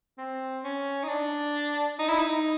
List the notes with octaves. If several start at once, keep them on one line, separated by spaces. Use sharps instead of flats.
C4
C#4
D#4
D4
D#4
E4
D#4